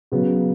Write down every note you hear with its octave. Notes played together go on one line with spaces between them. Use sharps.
C#3 F#3 B3